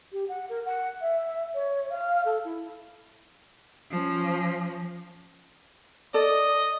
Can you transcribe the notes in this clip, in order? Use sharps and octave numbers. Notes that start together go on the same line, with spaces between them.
G4
F#5
A#4
F#5
E5
C#5
F5
A4
E4
F3 C#4
A4 D5 D#5